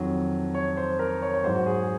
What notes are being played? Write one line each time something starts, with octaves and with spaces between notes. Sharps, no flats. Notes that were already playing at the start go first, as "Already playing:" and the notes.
Already playing: F2 D#3 F#3
C#5
C5
A#4
C#5
C#5
G#2 F#3 C5
F#4
G#4
G#4